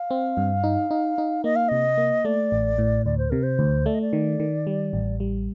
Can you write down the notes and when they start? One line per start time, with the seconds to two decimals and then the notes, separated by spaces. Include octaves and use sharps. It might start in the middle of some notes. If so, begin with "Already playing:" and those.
Already playing: F5
0.11 C4
0.37 G2
0.63 D#4
0.91 D#4
1.18 D#4
1.44 A#3 D#5
1.56 F5
1.69 C3 D#5
1.98 A#3
2.25 A3 D5
2.52 A1
2.78 A2
3.06 D2 D5
3.18 C5
3.30 C3 A#4
3.43 C5
3.59 D2
3.86 A3 D5
3.94 D#5
4.02 D5
4.13 D#3
4.40 D#3
4.67 G3
4.93 A1
5.20 G3